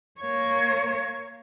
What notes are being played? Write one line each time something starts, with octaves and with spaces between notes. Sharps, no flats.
A#3 C#5